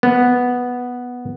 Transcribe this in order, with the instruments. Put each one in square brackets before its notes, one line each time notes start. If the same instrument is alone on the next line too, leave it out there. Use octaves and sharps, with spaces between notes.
[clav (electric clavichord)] B3